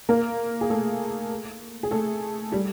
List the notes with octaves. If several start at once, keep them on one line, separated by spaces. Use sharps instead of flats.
A#3 A#4
G#4
A3 A4
G#4
A3 A4
G3 G4